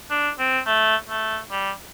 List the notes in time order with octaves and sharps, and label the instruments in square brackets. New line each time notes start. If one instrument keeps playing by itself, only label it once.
[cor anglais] D4
C4
A3
A3
G3